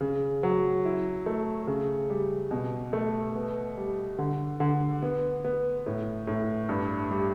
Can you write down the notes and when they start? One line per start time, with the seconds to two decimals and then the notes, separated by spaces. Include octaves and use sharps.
0.01 C#3
0.43 F#3
0.85 E4
1.26 A3
1.67 C#3
2.10 G3
2.51 B2
2.93 A3
3.35 B3
3.77 G3
4.18 D3
4.60 D3
5.02 B3
5.44 B3
5.86 A2
6.27 A2
6.69 G2
7.11 G3